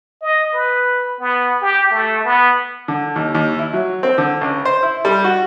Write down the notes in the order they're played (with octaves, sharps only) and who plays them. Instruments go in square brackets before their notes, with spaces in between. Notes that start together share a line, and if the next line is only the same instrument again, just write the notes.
[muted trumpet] D#5
B4
B3
G4
A3
B3
[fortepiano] D3
D#2
D#2
E4
F#3
C4
D3
C#2
C5
E4
G3
F#4